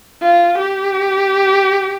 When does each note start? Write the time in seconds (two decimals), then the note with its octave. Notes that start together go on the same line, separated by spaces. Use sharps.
0.23 F4
0.58 G4